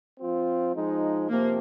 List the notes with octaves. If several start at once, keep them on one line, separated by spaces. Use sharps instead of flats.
F3 C4 F4
F3 G#3 D#4
C3 F3 A#3 C4